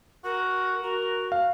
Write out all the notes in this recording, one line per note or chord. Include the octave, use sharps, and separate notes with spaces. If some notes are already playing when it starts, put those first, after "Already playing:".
F#4 A#4
F#4 A#4
F5